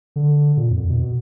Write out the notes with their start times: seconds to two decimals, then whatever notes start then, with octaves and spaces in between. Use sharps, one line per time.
0.16 D3
0.57 A#2
0.70 F2
0.90 B2